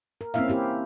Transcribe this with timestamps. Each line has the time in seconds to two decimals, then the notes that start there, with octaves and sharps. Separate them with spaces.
0.21 A#4
0.34 A#3 C4 C#4 E4 E5 F5
0.49 C4 E4 G4